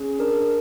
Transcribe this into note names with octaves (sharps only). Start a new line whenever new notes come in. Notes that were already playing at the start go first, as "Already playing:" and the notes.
Already playing: C#4 G#4
D4 A#4